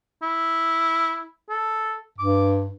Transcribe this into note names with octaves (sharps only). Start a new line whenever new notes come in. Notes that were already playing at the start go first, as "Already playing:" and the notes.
E4
A4
G2 D6